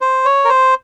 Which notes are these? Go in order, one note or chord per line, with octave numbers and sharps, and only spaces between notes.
C5
C#5
A#4
C5